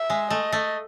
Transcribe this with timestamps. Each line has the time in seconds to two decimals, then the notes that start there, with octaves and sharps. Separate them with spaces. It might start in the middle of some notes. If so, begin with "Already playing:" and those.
Already playing: E5
0.10 G#3
0.30 A3 D#5
0.53 A3